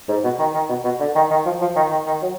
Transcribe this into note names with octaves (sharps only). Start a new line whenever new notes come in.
G#2
B2
D#3
D#3
B2
B2
D3
D#3
D#3
F3
F3
D#3
D#3
D#3
F#3